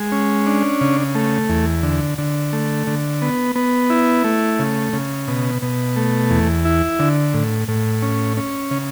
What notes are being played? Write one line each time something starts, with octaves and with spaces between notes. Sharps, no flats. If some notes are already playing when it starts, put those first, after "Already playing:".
Already playing: G#3
C#4
D4
C#3
A3
E2
D3
D3
A3
D3
B3
B3
E4
A3
C#3
C#3
B2
B2
A3
E2
E4
D3
A2
A2
C#4
C#4
C#3